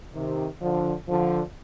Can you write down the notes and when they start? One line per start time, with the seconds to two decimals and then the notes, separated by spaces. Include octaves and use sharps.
0.14 C3 D#3
0.61 D3 F3
1.08 D3 F3